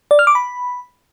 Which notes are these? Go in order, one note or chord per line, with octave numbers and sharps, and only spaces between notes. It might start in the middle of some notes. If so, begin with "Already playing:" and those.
D5
F6
D6
B5